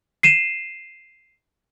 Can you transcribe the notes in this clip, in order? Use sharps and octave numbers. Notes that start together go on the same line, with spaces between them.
C7 D#7 E7